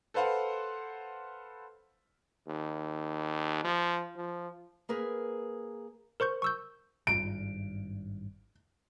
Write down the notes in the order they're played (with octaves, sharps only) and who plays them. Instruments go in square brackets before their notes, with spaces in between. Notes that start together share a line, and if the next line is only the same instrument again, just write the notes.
[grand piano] A4 B4 C5 F5 F#5
[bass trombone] D#2
F3
F3
[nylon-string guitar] A#3 G#4 A#4 B4
[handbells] A#4 C5 C#6 G6
C#6 E6 G6
[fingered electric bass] G#1 G2 [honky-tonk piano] D7